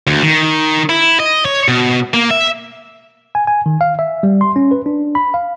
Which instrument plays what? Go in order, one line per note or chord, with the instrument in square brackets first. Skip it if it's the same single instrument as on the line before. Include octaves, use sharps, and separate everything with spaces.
[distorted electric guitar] D2
D#3
E4
D#5
C#5
B2
A#3
E5
[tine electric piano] G#5
G#5
D#3
F5
E5
G3
C6
C#4
B4
D4
B5
F5